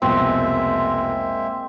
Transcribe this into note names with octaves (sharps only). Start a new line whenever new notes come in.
C2 F2 B2 G#3 A#3 C4 E5